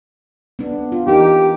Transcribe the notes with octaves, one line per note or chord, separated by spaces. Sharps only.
B3 D4
F4
E3 D#4 G4 A#4